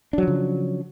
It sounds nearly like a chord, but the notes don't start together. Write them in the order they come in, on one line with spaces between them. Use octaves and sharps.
D4 F#3 F3 C#3